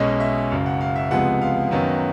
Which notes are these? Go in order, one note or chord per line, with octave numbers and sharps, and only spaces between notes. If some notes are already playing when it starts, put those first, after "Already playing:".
Already playing: B1 B2 G#3 C#4 D#5
E5
F#1 F#2 C#3 F5
F#5
F5
E5
C#2 C3 F3 G#3 B3 F#5
F5
F#2 D#3 F#3 B3